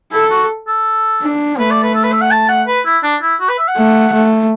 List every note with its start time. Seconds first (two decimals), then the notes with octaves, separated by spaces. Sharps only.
0.12 E4 A4
0.30 F#4
0.67 A4
1.22 D4
1.58 A3 B4
1.71 D5
1.83 B4
1.94 A4
2.04 B4
2.12 E5
2.21 F#5
2.31 A5
2.49 F#5
2.67 B4
2.85 E4
3.03 D4
3.22 E4
3.40 F#4
3.49 B4
3.58 E5
3.68 F#5
3.76 A3
4.13 A3